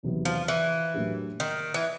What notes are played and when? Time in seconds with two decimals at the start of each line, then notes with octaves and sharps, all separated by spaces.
0.03 E2 C3 D#3 F#3 B3
0.25 F3
0.48 E3
0.94 A2 F#3 A#3 D4 G4
1.40 D#3
1.74 E3